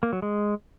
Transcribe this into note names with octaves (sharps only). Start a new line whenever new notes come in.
A#3
F#3
G#3